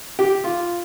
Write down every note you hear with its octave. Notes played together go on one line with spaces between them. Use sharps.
G4
F4